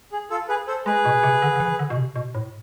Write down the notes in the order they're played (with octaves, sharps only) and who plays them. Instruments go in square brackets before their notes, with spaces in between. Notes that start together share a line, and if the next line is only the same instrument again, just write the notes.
[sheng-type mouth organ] G#4
F4 A4
G#4 B4
A4 C5
[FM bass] G#3 [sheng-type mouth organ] G#4 B4
[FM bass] B2
C3
D3
D3
E3
D3
B2
C3
B2
A2